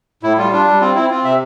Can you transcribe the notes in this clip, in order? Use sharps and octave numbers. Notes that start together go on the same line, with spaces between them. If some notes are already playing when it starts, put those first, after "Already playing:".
A2 E4
G3 F4
D4 F4
G3
C4 F4
C4 E4
C4 F4
C3 E5